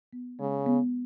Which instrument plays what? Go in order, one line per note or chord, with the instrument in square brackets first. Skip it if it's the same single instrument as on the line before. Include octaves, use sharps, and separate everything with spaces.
[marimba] B3
[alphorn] C#3 [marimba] G#3
[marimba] B3